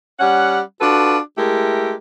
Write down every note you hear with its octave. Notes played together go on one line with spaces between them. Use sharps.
G3 C#4 F#5
D4 F4 F#4 A4 B4
G#3 A3 E4 G4 A#4